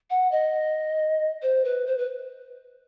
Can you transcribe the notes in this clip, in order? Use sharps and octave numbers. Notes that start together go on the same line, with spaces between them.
F#5
D#5
C5
B4
C5
B4